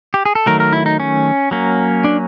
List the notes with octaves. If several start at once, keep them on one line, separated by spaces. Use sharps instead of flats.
G4
G#4
A4
D#3 F#3 A3 A#4
A#4
E4
D#4
C#4
F#3 A#3 C#4
D4